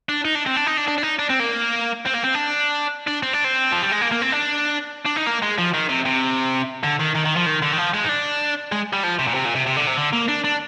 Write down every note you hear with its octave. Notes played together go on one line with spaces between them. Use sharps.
D4
D#4
D4
C4
D4
D#4
D4
D4
D4
D#4
D4
C4
A#3
C4
A#3
C4
D4
D4
C4
D4
C4
F3
G3
G#3
A#3
A#3
C4
D4
D4
D#4
A#3
G#3
F3
D#3
C3
C3
D3
D#3
D#3
D#3
F3
D#3
D3
D#3
F3
G#3
D#4
D4
G#3
G3
F3
C3
A#2
C3
A#2
C3
C3
D3
C3
D3
A#3
D4
D4